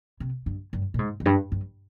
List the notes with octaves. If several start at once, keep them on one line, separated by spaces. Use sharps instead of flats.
C3
G2
G2
A#2
G#2
F2
G2
G2